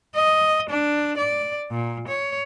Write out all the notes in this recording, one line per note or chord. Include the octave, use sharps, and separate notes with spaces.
D#5
D4
D5
A#2
C#5